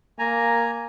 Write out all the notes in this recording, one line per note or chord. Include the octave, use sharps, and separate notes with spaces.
A#3 G#5 A#5